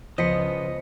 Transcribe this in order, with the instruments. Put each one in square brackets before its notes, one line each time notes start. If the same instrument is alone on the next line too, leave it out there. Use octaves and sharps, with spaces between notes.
[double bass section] C#2 C#3 [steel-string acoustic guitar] F3 B3 [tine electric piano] C5 B6 C#7 [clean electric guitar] D#5